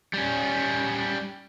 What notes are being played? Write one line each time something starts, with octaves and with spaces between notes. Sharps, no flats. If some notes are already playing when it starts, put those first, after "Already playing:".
G3 C#4